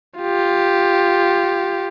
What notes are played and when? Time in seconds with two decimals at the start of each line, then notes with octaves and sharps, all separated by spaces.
0.20 F4 G4